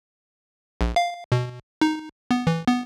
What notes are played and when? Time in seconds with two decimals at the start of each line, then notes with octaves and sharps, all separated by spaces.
0.81 A#1
0.96 F5
1.32 B2
1.81 D#4
2.31 B3
2.47 E3
2.68 B3